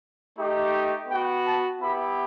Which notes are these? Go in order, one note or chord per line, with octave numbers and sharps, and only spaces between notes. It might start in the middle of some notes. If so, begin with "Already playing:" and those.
A3 D#4 G4
B3 F#4 G5
A5
B3 E4 G4 B5